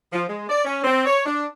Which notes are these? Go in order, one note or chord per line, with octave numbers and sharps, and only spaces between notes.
F3
G#3
D5
C#4
C4
C#5
D4